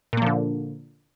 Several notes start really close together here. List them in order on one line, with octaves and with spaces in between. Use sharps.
A#2 A#3 F3 D3